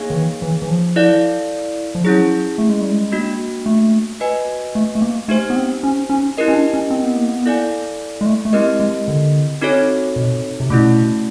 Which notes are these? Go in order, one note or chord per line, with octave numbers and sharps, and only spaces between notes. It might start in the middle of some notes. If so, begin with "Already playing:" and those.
Already playing: A#3 D#4 G#4 C#5 F5
D#3
E3
E3
E3
F3
E4 A4 D5 F5
F3
F#3 C#4 E4 G#4
A3
G#3
G3
G#3
A#3 D4 F#4
A3
F#4 B4 D#5 G#5
A3
A3
A#3
A3 D#4 G4 C5
B3
C4
C#4
C#4
E4 G4 A#4 D#5
C#4
D4
C#4
C4
B3
A#3
B3
E4 A4 D5 F5 G#5
G#3
A3
A3
G#3 C4 E4 G4 A#4 D#5
G#3
D3
C4 D#4 F#4 A4 C#5
B2
C3
B2 A3 C#4 E4